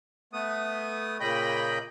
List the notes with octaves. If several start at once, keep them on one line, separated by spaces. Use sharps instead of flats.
A3 B3 D#6
A#2 C#3 D#5 G5 B5